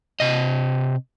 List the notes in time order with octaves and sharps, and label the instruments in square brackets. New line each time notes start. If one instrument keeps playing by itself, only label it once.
[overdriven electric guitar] C3 D#5